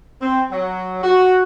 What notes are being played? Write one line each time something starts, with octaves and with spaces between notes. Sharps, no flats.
C4
F#3
F#4